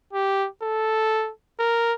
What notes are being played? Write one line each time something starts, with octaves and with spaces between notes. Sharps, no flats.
G4
A4
A#4